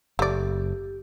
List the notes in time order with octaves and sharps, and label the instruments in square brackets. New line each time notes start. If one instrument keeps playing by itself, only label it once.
[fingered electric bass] F#1 [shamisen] A3 D5 [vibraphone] G4